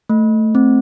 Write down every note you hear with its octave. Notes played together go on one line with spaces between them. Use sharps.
A3
C4